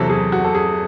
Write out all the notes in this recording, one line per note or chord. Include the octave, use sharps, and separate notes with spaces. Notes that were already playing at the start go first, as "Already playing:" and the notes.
Already playing: E2 C3 F#3 A4
G#4
F#4
A4
G#4